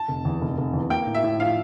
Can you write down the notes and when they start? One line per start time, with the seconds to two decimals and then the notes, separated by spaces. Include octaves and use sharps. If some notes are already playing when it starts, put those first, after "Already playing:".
Already playing: A5
0.08 F1
0.25 E2
0.41 F1
0.58 F1
0.73 E2
0.90 A#3 G5
1.06 A2
1.15 E5
1.23 A2
1.39 F3 F5